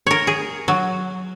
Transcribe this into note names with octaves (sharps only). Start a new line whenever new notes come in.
A#4 C#5
G#4
F#3